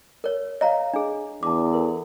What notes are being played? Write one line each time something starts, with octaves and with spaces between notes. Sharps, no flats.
A#4 C#5
C#5 D#5 F5 A#5
D4 G#4
E2 A5 D6
A4 A#4